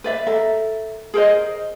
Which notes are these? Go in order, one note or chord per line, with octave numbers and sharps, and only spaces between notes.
B4 D5 E5
A4 A#4 E5
G#4 A#4 C5 D#5